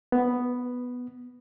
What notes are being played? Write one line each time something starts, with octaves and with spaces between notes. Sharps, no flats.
B3